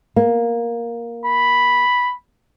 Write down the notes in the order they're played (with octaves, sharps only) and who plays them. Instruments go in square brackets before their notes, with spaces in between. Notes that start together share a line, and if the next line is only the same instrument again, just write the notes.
[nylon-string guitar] A#3
[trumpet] B5